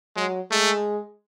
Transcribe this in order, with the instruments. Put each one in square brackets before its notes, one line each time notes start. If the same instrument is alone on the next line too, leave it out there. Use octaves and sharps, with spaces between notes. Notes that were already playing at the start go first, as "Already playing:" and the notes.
[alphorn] F#3 [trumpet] G#3
[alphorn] G#3 [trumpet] A3